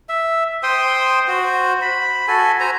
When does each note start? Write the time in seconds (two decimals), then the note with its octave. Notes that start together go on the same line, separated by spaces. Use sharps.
0.09 E5
0.63 C5 G5 C6 D#6
1.28 F#4 C5
1.82 B5
2.28 F#4 A4 G#5
2.60 C5 G#5 A#5